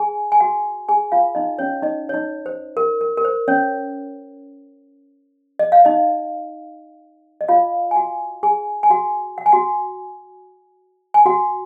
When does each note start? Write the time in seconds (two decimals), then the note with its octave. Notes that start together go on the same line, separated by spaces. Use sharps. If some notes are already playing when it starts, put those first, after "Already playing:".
Already playing: G#4 G#5
0.32 G#5
0.40 F#4 F#5
0.89 G#4 G#5
1.12 F4 F5
1.35 D#4 D#5
1.59 C#4 C#5
1.82 D#4 D#5
2.09 C#5
2.14 D#4 D#5
2.46 C5
2.77 A#4
3.01 A#4
3.17 A#4
3.25 C5
3.48 C#4 C#5
5.59 D#5
5.72 F5
5.85 D#4 D#5
7.41 D#5
7.48 F4 F5
7.91 G#5
7.96 F#4 F#5
8.43 G#4 G#5
8.83 G#5
8.90 F#4 F#5
9.38 F#5
9.46 G#5
9.52 F#4 F#5
11.14 G#5
11.26 F#4 F#5